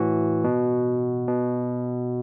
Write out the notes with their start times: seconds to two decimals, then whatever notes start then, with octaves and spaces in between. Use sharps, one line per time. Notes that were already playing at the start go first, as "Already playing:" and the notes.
Already playing: A2 E3 F#4
0.44 B2
1.28 B2